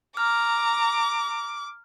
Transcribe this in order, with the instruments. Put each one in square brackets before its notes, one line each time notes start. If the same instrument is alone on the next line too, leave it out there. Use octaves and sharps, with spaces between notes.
[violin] A#5 [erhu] D6 [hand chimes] F6